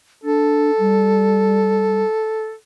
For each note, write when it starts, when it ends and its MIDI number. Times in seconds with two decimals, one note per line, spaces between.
0.24 0.71 62
0.24 2.54 69
0.79 2.03 55